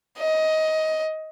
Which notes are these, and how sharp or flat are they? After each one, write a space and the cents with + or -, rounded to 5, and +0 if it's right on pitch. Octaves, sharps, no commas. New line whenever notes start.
D#5 +15